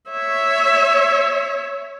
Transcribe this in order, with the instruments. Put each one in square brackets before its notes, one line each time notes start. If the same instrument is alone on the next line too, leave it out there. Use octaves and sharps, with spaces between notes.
[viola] C#5 E5